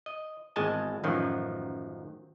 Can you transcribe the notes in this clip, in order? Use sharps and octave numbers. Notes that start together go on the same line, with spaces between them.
D#5
G#1 E2 G#3 D#5 G#5 A5
A1 F#2 D#3 F3 F#3